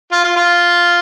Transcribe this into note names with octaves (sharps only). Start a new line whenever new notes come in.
F4
F4
F4